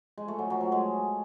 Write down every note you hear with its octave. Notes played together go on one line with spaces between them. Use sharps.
G#3
A3
F#3
F#3
F#3
G#3